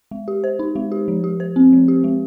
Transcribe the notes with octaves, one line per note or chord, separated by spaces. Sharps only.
G#3
G4
C5
D#4
G#3
G4
F3
G4
C5
C4
F3
G4
G#3